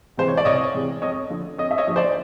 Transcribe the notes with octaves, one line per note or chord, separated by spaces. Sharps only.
C3 E3 G#3 C5
C#5
D5
C2 C#5 D#5
C3 E3 G#3
F2 C#5 D#5
D3 F3
F2 C#5 D#5
E5
C#5 D#5
D3 F3
C5 D5